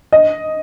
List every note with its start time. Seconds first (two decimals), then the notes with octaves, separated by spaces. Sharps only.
0.13 D#5